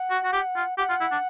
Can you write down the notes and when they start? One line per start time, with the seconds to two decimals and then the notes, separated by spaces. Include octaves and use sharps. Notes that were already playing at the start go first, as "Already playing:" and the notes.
Already playing: F#5
0.11 F#4
0.24 F#4
0.33 G4
0.56 F4
0.78 G4 F#5
0.89 F4
1.01 E4
1.12 D4